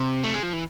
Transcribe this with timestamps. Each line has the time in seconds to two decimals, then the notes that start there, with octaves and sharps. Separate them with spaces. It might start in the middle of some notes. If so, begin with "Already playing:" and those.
Already playing: C3
0.23 A3
0.34 G#3
0.43 F3
0.53 E3